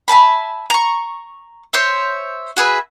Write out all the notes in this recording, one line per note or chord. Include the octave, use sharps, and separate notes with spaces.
E5 G#5 A5 B5
A#5 C#6
C5 C#5 E5
F#4 G#4 B4 E5